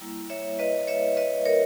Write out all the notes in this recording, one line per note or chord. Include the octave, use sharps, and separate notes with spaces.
G3 A#3 E4
C#5 E5
B4 D#5
C#5 E5
B4 D#5
A#4 C#5